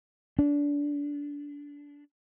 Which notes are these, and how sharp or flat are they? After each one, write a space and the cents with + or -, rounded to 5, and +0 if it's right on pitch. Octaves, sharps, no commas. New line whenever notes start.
D4 -25